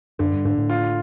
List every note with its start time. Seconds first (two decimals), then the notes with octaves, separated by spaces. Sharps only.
0.19 F#2 D3
0.33 G2
0.45 G#2 D3
0.57 A2
0.70 F4